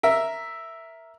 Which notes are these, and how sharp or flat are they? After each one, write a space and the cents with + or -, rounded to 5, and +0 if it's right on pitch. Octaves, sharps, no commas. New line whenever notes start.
A#4 +0 E5 +0